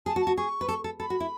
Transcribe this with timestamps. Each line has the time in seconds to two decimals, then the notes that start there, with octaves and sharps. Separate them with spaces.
0.06 G#4 A5
0.16 F#4
0.21 A5
0.27 F#4
0.37 G#4 C#6
0.61 B4
0.69 A4
0.84 A4
1.00 A4 B5
1.10 F#4
1.20 E4